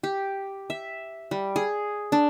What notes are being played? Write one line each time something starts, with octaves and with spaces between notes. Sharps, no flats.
G4
E5
G3
G#4
D4